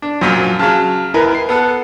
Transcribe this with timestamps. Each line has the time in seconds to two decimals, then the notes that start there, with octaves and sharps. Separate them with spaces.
0.02 D4
0.21 F#2 A#2 F3 F#3
0.59 C#3 F#3 A5 F6
1.14 D#2 E4 A#4 B4
1.35 C7
1.49 B3 A4 F#5